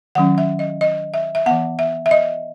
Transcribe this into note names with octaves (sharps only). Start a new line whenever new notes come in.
D#3 F#3 C#4 F#5
E5
D#5
D#5
E5
E5
E3 B3 F#5
E5
E5
D#5